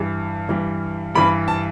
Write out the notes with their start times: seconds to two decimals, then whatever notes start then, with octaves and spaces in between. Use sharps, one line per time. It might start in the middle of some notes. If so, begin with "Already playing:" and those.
Already playing: G2 E3 G3
0.49 G2 E3 G3
1.15 G2 E3 G3 B5
1.48 A5